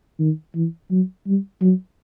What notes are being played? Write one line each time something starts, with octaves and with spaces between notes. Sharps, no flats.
D#3
E3
F#3
G3
F#3